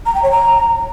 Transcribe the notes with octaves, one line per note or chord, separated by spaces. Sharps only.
A#5
G5
C#5
A#5